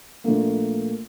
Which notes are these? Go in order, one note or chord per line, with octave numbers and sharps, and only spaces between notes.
A#1 A3 A#3